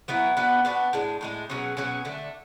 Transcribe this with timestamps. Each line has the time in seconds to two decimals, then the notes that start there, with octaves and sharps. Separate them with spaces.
0.08 F#3 B3 E4 B4
0.37 B3 D4 F#4 B4
0.65 B3 D4 F#4 B4
0.93 A2 G#3 D4
1.21 A2 G#3 D4
1.50 B2 F#3 C#4 G#4
1.77 B2 F#3 C#4 G#4
2.05 D3 A3 D4